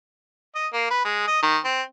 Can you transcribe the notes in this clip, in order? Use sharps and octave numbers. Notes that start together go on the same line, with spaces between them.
D#5
A#3
B4
G#3
D#5
D#3
C4